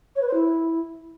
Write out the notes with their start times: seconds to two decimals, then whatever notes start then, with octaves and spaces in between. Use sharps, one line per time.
0.16 C#5
0.22 B4
0.28 C5
0.34 E4